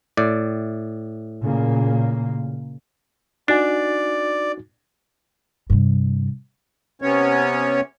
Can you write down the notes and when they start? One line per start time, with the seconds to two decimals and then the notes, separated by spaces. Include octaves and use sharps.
0.17 A2 D5
1.42 A#2 C#3 A#3
3.48 D4 D#4 F#4 D5 G#5
5.70 G2 C3
7.02 C3 B3 C#4 C#5